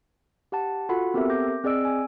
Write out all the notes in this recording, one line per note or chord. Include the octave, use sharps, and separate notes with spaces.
G4 F#5 A5
F4 F#4 A4 F#5 B5
B3 C4 G4 A4 A#4 E5
D6 G6 A#6
C4 G#4 D5 D#5 E6 D7
G#5